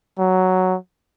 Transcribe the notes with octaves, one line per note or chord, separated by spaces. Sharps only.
F#3